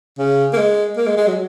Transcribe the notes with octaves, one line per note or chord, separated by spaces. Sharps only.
C#3
A#3
G#3
A#3
G#3
G#3
F#3